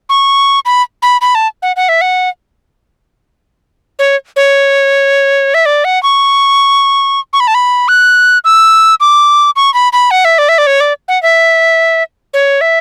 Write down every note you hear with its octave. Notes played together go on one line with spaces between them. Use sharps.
C#6
B5
B5
B5
A5
F#5
F#5
E5
F#5
C#5
C#5
E5
D5
F#5
C#6
C#6
B5
A5
B5
F#6
E6
D6
C#6
B5
B5
F#5
E5
D5
E5
D5
C#5
D5
F#5
E5
C#5
E5